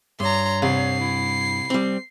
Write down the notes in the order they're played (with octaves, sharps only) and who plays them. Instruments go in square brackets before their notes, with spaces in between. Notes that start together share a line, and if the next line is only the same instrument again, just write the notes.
[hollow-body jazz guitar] G2 [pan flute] C#5 [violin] A#5 C6
[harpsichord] C2 [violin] C7
[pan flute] E4
[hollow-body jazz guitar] G3 C4